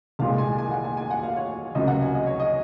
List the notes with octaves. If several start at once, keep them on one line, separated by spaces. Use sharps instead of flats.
C2 A#2 G#3 F5
G#5
G#5
F#5
G#5
G#5
F#5
F5
C#5
C#2 C3 F#3 A#3 D#5
F#5
G#5
D#5
C#5
D#5